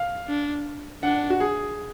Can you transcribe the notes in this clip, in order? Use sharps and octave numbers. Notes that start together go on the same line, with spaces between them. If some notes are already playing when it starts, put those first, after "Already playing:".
Already playing: F5
D4
D4 F#5
F#4
G#4